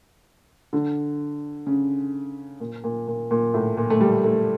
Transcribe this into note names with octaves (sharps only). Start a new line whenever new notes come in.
D3
C#3
A#2
A#2
A#2
A#2
A2
A#2
A3
G3
A3